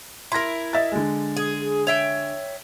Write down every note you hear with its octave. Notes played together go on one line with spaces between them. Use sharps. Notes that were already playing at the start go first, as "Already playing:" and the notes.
E4 A#4 C6 A#6
D#5 E5 A6
D3 G#3
G#4
C#5 E5 G5